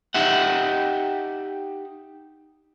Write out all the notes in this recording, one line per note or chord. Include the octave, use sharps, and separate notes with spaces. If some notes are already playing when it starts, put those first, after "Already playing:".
D#4 G4 E5 F#5